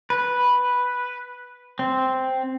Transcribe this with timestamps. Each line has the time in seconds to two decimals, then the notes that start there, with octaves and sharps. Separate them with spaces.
0.10 B4
1.79 C4